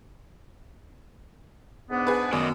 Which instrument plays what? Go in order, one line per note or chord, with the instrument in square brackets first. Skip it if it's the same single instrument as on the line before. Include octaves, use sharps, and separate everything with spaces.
[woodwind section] G#2 B3 D4
[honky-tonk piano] G#4 B4
[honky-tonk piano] F#2 [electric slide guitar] D#3 B3 A#4 [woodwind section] D5 D#5